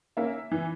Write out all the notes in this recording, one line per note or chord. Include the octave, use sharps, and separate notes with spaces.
A#3 C#4 E5
E3